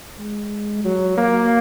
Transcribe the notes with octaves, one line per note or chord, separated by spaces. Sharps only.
G#3
F#3
A#3